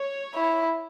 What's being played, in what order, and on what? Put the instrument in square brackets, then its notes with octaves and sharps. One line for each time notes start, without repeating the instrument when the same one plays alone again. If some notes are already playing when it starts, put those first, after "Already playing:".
Already playing: [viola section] C#5
[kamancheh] E4